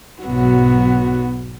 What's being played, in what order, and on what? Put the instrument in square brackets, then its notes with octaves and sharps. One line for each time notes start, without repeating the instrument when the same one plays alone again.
[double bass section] B1 G#2 F#3 [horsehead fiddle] B3 F#4